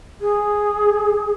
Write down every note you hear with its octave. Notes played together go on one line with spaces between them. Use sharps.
G#4